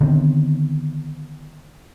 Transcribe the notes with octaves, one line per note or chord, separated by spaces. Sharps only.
D3 D#3 B3 C4